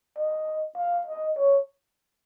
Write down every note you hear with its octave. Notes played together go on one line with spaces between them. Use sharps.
D#5
F5
D#5
C#5